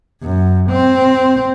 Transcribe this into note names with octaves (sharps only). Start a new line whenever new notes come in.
F#2
C4